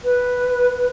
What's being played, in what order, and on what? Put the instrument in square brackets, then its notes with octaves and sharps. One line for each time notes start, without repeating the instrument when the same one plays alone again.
[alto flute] B4